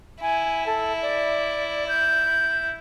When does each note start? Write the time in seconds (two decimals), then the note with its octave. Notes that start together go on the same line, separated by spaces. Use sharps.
0.22 E4 G#5
0.66 A4
1.02 D5
1.88 G6